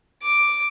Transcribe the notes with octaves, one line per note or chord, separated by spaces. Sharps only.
D6